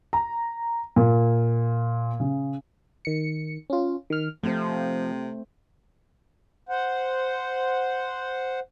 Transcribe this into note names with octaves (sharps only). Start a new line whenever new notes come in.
A#5
A#2
C#3
D#3 C#7
C#4 F4
D#3 F6
C3 F3 A3 C4 C5
C5 F#5